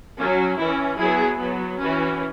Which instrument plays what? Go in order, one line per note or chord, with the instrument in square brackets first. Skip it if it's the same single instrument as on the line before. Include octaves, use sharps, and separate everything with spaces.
[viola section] F#3 C#4
E3 C#4 E4
F#3 B3 E4 G#4
F#3 B3
E3 C#4 F#4 B4